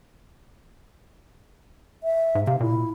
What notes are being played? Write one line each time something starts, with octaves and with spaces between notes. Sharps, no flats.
E5
G#2
C3 F5
A#2 E4